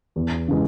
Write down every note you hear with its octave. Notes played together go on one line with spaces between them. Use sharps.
E2
C#3 E3 G#3